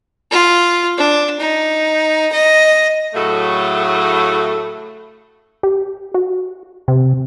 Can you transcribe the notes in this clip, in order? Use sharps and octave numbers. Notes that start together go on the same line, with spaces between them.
F4
D4
D#4
D#5
A2 C#3 F#3 A3
G4
F#4
C3